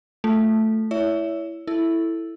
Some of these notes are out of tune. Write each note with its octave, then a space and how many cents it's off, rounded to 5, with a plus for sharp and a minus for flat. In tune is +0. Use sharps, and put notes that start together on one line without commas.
A3 +0 F4 +0
E4 +5 C#5 +30 E5 +0
E4 +0 A4 +0